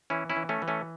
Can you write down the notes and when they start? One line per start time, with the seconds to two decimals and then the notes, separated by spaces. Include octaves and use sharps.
0.10 E3 C#4 E4
0.30 C#4 E4
0.36 E3
0.49 A3 C#4
0.62 E3
0.68 A3 C#4